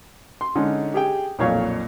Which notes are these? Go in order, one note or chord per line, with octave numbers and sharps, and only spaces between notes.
C6
D3 G#3 C#4 D#4
G4 G#4 G5
B1 F2 A#2 C#5 F5 C#6